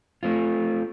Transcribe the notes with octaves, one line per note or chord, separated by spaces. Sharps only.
A3 C4 F4